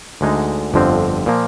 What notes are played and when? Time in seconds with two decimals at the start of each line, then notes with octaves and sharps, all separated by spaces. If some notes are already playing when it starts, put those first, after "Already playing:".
0.21 D2 D3 G#3 D#4
0.74 G1 F2 D3 F3 C4
1.26 A#2 F3 A#3